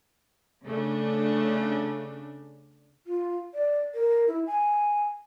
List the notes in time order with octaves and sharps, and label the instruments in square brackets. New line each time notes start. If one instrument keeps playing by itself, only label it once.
[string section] C#3 A3 D4
[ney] F4
D5
A#4
E4
G#5